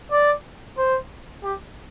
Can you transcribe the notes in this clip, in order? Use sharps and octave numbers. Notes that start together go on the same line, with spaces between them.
D5
C5
G4